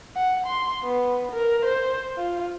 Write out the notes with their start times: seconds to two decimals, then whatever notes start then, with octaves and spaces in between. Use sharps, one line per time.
0.16 F#5
0.46 C6
0.83 B3
1.32 A#4
1.65 C5
2.17 F4